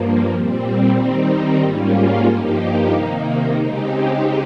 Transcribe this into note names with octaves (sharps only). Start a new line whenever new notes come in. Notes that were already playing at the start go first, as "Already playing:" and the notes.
Already playing: G2 F3 A#3
A#2 G3 C4
D#3 G3 C4 D#4
G#2 G3 A#3 C#4 F4
G2 F3 A#3 D#4 G4
C3 D#3 A#3 D#4
C#3 G#3 C4 D#4 G4